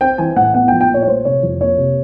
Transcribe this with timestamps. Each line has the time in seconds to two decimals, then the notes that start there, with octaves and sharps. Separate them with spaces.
0.01 C4 G5
0.18 E3 G#5
0.36 A2 F#5
0.54 B3 F#5
0.68 G5
0.72 F3
0.81 G5
0.89 A#2 C#5
1.03 C#5
1.07 A3 C5
1.25 C3 C#5
1.43 F2
1.61 A#3 C#5
1.78 C3